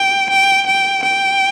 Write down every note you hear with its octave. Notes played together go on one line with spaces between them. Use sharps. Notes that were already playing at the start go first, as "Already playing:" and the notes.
Already playing: G5
G5
G5
G5